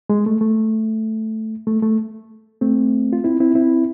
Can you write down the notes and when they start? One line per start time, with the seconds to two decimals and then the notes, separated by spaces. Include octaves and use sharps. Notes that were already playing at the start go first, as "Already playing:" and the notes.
0.10 G#3
0.26 A3
0.41 A3
1.67 A3
1.82 A3
2.61 A3 C4
3.13 F4
3.24 C4 E4
3.40 C4 E4
3.55 C4 E4